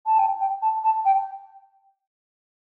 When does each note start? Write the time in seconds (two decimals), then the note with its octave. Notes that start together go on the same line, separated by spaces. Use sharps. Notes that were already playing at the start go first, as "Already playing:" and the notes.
0.06 A5
0.19 G5
0.40 G5
0.62 A5
0.84 A5
1.05 G5